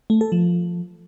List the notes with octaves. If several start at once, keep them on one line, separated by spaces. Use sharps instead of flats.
A3
A4
F3